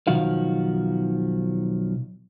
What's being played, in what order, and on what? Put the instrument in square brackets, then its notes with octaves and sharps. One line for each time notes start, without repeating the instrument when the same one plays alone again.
[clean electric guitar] B1 D#3 F3 F#4 F5